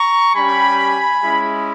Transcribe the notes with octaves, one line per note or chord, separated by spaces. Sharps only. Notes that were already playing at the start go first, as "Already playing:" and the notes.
Already playing: A#5 C#6
G3 C#4 G4 G#5 B5
G#3 C#4 E4